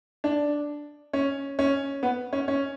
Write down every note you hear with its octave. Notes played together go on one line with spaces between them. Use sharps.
D4
C#4
C#4
B3
C#4
C#4